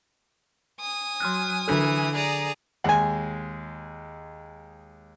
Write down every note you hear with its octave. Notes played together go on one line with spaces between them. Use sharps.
G#5 D#6
F#3 C6 F6 F#6
D3 E3 D4 A4
G#4 D5 A#5 D#6
D#2 G#3 F#5 G#5